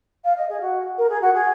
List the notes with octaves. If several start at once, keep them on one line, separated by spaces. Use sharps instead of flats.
F5
D#5
G#4
F#4
A#4
G#4
F#4
G#4